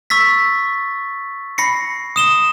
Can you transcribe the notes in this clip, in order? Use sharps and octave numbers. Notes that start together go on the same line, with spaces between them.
C#6 E6 A6 B6
B5 A#6 C7 C#7
D#6 E7 G7